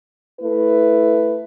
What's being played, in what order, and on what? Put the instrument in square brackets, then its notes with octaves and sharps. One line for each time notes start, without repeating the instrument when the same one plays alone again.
[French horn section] A3 E4 B4